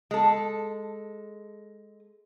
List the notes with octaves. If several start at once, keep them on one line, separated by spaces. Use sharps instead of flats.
G#3 A4